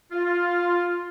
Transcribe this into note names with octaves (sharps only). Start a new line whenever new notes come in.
F4